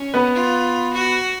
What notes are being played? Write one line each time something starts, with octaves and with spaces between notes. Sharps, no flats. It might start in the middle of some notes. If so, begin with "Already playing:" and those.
Already playing: C#4
B3 B4
F4
F#4